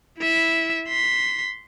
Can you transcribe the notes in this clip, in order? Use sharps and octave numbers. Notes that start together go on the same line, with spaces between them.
E4 E5
C6 B6